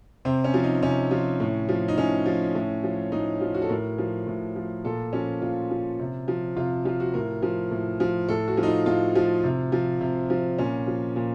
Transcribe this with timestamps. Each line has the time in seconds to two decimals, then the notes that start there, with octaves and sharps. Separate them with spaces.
0.25 C3 C4
0.44 C#4
0.54 F3
0.63 D#4
0.82 C3 C#4
1.11 F3
1.40 A2
1.69 F3
1.88 D#4
1.97 A2 C#4
2.26 F3
2.55 A2
2.84 F3
3.12 A2 D#4
3.41 F3
3.54 F#4
3.62 A4
3.69 A2 A#4
3.98 F3
4.27 A2
4.56 F3
4.85 A#2 A4
5.13 F3 C#4
5.42 A#2 F4
5.70 F3
5.99 C3
6.28 F3
6.56 C3 F4
6.85 F3 F4
7.00 F#4
7.14 A2 A#4
7.43 F3
7.71 A2
8.00 F3
8.28 A2 A4
8.48 F#4
8.57 F3
8.63 D#4
8.67 F4
8.86 A2 F4
9.15 F3
9.44 C3
9.72 F3
10.01 C3
10.30 F3
10.58 A#2 C#4
10.87 F3
11.16 A#2